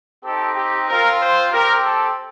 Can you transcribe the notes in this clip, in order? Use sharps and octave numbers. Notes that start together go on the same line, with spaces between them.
C4 D#4 G4 A4
G4
C4 F4 A#4
C5
C4 G4 A#4
A4